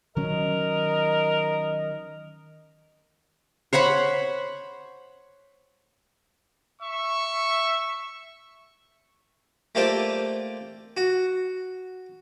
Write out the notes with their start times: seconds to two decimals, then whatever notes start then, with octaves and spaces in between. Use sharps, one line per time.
0.16 D#3 F#3 C#4 A#4 D#5
3.73 C5 C#5 F#5 B5
6.82 E5 C#6
9.75 A3 A#3 F4 G4 C5 D5
10.97 F#4